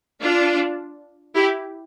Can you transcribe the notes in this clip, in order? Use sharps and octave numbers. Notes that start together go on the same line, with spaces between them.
D4 F4
E4 G4